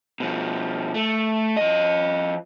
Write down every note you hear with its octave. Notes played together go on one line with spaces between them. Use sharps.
B2 F3
A3
F3 D#5